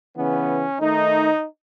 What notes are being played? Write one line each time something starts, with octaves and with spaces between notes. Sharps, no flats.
C#3 E3 B3 C#4
D#3 A3 D#4